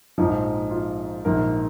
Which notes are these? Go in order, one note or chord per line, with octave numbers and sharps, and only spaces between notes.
A#1 G#2 F3 D#4
F4
A#1 G#2 D#3 A#4